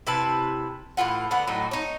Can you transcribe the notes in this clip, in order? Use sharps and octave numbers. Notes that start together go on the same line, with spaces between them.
C3 E4 B4 A5
A2 E3 F4 F#5
D3 B3 F#5
A2 F#3 D#4
D#4 C#5